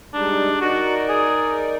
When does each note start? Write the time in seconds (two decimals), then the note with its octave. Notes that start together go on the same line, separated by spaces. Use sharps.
0.14 G3 G#3 D4 D#4
0.61 D#4 F#4 A#4 D5
1.09 G#4